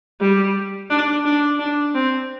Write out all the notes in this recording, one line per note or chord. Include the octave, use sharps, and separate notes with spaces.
G3
D4
D4
D4
C4